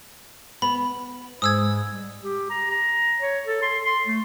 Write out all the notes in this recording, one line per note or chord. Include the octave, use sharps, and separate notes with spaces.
B3 B5
G#2 D#6 E6 G#6
G3
G4
A#5
A#5
C#5
A4
C6
C6
A3